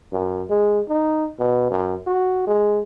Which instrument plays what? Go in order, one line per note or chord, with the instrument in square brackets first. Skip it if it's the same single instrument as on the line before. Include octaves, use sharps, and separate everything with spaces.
[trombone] F#2
G#3
D#4
B2
F#2
F#4
G#3